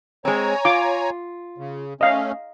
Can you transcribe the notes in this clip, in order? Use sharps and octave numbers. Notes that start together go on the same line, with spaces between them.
G#3 C4 C#5 G#5 A#5
F4 D6
C#3
A3 C#4 D#5 F5